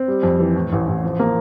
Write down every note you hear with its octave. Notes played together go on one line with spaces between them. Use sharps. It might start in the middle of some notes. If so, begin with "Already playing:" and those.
Already playing: C4
G3
F2
E3
A2
A1
A1
F3
A#3